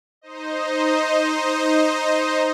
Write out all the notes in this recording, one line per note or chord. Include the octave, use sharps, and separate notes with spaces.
D#4 C5 D#5